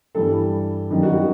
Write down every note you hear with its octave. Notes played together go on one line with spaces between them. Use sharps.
G2 E3 G3 A4
F#2 D#3 G3
F#4
F#4